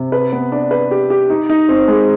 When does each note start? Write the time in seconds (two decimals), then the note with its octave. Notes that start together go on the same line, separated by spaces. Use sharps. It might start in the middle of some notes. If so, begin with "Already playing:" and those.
Already playing: C3
0.12 B4
0.32 B3
0.52 D4
0.71 B4
0.91 G4
1.10 G4
1.30 D#4
1.49 D#4
1.69 C4
1.88 G#3